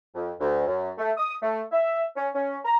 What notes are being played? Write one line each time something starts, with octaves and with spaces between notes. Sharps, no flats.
F2
D2
F#2
A3
D#6
A3
E5
C#4
C#4
A#5